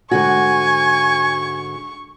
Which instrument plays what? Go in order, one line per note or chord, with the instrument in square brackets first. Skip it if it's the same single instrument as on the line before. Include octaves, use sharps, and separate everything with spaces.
[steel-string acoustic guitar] G#2 D3 F#4 [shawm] G#5 [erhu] C#6